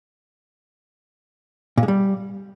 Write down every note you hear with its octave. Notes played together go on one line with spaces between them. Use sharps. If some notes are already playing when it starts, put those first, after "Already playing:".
A#2
G#3
G3